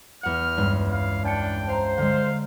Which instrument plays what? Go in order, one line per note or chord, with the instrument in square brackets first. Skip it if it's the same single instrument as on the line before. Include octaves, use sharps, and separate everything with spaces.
[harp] E2 F#5 [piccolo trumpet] F6
[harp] C#2 G2
[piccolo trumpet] F5
[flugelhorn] D4 [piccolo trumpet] G5 [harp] A6 C#7
[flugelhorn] C5 [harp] F5 A#5
[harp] D3 G#3 [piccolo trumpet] F5